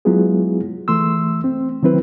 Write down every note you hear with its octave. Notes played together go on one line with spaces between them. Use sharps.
F#3 G#3 B3 E4 F4 G#4
E3 A3 C6 E6
C4
D#3 F#3 C4 E4 B4